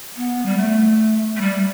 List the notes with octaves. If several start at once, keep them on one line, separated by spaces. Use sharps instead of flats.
B3
G3
A3
A3
G3